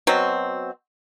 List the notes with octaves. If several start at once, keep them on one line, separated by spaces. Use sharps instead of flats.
B2 F#3 C4